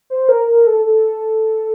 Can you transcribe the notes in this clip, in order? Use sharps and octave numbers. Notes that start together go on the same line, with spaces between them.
C5
A#4
A#4
A4
A4